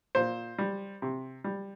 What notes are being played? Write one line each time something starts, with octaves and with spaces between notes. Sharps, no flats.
A#2 C5
G3
C3
G3